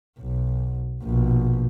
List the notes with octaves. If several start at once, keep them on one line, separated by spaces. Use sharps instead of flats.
B1
A#1 B2